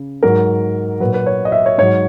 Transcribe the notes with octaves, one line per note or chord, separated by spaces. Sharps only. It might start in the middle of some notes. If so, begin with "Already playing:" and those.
Already playing: C#3
G#2 F#3 A#4
A#2 F#3 B4
B4
C#5
D#5
E5
C#5
G#2 F#3 C#5